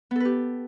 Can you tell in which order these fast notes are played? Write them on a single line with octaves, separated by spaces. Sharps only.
B3 A4 B4 G4